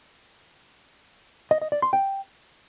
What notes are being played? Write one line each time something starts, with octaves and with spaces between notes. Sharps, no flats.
D#5
D#5
D5
C6
G5